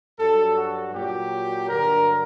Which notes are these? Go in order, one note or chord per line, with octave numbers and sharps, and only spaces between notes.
G2 F#3 A4
F#4
A#2 F#3 G4
G2 D3 F#3 A#4